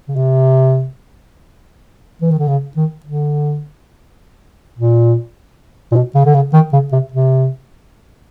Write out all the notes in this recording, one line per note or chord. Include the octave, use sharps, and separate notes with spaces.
C#3
C3
E3
D#3
D3
C#3
D#3
D3
A#2
A#2
B2
C#3
D3
C#3
D#3
C#3
C3
C3